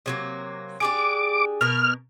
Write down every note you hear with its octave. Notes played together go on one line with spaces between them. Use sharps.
C3 F#3 A#3
D4 G4 G#4 D6
B2 A#4 F6